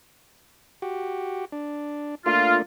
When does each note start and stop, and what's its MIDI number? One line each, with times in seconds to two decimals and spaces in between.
0.82 1.45 66
0.82 1.45 67
1.52 2.15 62
2.26 2.62 57
2.26 2.62 58
2.26 2.62 62
2.26 2.56 65